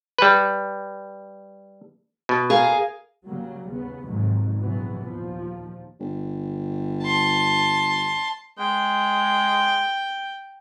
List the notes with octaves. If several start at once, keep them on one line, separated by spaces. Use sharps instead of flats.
G3 B4
B2
G#4 A#4 F5
C#3 F#3 G3 A#3
D#2 C#3 B3
F2 G#2 C3 D#3 F#3
A#1 C3 E3 F#3 B3
D#2 A#2 F3
G1
A5 C6
G#3 G5